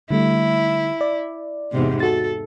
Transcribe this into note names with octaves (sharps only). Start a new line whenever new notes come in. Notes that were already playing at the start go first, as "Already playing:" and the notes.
D3 G3 A3 E4
D5
E2 G#2 C3
F#4 A4 A6